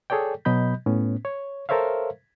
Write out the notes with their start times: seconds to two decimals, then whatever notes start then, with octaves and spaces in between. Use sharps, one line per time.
0.10 G#4 A4 C#5 D5 G5
0.45 B2 F#3 D#5 B5 G6
0.86 A2 B3 C#4
1.25 C#5
1.69 A4 A#4 C5 C#5 E5 F5